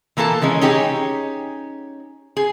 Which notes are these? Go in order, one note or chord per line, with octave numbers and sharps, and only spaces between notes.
E3 A#3 F4 A4 A5
D#3 E3 G#3 C#4
C#4 D#4 G4 G#4 C#5
G#4